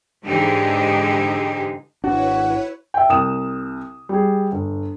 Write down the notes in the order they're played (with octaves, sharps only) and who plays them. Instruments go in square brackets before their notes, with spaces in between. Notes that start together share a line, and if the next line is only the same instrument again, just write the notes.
[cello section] G#2 D3 E3 D#4 G4 G#4
[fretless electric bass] G#1 D4 [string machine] E4 B4 C#5 [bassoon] F#4
[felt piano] E5 G5
C2 D#6 E7
G3 G#4
G1